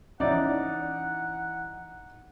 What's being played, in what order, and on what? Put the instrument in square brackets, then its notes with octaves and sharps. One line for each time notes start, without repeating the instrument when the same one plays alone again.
[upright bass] E3 [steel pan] C#4 E5 A#5 [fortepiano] D#4 D5 [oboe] F#5